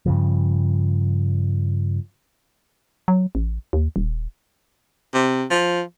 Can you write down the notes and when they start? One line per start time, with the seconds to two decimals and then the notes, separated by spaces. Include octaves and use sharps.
0.06 G2 C#3 F3
3.08 F#3
3.35 A1
3.73 D#2
3.96 D#1
5.14 C3
5.50 F3